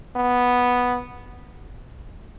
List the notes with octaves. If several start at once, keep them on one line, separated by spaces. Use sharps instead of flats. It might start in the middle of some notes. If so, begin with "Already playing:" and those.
B3